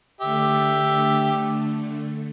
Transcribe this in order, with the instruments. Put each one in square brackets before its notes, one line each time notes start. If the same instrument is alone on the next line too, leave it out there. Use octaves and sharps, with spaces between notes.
[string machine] D3 A3 [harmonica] G4 E5